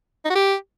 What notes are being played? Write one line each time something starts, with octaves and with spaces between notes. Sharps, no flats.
D#4
F#4
G4